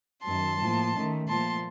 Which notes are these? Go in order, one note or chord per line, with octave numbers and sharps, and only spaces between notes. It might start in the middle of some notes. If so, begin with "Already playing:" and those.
F#2 D#3 F#3 A5 C6
A2 F3 A#3
D#3 A3 C#4
A#2 F3 A3 A5 C6